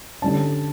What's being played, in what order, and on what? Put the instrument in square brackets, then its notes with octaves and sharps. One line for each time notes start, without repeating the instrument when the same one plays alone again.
[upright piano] D3 G3 C#4 A5